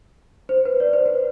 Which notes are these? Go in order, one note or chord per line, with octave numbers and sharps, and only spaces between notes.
C5
B4
D5
C5
B4